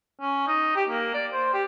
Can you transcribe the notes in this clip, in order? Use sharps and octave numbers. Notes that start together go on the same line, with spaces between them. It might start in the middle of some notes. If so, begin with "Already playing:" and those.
C#4
D#4
G4
A#3
D5
C5
G4